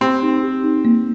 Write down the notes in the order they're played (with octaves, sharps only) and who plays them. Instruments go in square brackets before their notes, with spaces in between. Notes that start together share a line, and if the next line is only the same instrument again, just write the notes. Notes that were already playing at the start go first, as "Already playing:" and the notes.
[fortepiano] C4 [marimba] G4
[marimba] D#4
G4
D#4
A#3